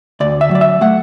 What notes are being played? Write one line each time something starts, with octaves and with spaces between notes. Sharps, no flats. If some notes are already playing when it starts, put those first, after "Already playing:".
D2 D5
E5
F#3 D5
E5
A3 F#5